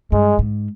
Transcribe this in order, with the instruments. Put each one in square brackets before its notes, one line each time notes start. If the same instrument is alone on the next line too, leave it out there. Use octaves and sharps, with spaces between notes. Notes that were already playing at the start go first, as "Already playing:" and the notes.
[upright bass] G2 [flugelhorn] G#3
[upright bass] G#2